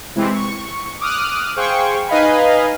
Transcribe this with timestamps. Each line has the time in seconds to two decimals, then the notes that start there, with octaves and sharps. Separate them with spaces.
0.15 C3 E3 G#3 C4
0.33 C#6
1.00 D6 D#6 F6 F#6
1.56 G#4 C5 F5 G5 C#6
2.08 D#4 B4 D#5 F5 G#5 B5